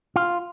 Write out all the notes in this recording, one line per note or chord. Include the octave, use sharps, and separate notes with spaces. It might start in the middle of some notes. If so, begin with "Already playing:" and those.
F4